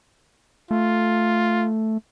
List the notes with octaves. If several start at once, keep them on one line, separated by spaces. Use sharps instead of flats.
A3 F4